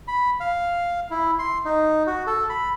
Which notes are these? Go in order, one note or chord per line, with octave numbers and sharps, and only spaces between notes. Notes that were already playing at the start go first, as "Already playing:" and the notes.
B5
F5
E4
C6
D#4
F#4
A4
B5